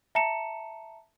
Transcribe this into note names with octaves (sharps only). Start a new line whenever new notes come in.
E5 A5 A#5 C#7 E7